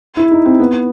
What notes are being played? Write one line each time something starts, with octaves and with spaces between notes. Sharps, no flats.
E4
D#4
C4
B3